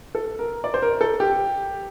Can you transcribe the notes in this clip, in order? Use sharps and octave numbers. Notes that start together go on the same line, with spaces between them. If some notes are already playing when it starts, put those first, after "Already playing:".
A4
A#4
D5
C5
A#4
A4
G4